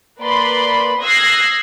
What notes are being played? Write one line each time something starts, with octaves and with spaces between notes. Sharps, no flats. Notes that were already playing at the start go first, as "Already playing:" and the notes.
A#3 B4 D5 B5 C6
D#6 E6 F#6 G#6 A#6 C7